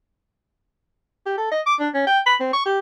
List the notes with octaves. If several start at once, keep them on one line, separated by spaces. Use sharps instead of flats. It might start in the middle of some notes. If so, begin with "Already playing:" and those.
G4
A4
D#5
D6
D4
C#4
G5
B5
C4
C#6
G4